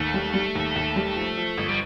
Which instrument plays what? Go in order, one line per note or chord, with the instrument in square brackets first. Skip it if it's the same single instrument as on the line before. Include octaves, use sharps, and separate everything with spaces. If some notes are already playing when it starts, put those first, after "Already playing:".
Already playing: [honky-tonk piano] D#2 [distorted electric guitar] A3
[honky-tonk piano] G3
G3
D#2
D#2
G3
F3
F3
G1
[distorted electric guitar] G3